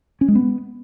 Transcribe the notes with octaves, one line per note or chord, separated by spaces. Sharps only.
C#4
G#3
B3